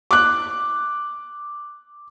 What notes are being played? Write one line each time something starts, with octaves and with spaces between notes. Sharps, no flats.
D6 F#6